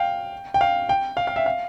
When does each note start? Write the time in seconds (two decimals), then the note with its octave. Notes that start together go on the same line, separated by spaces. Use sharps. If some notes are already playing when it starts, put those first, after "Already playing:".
Already playing: F5 G5
0.54 G5
0.61 F5
0.89 G5
1.17 F5
1.27 F5
1.36 E5
1.46 F5